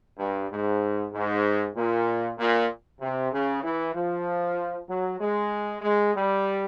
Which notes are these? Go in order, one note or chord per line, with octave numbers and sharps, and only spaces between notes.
G2
G#2
G#2
A#2
A#2
C3
C#3
E3
F3
F#3
G#3
G#3
G3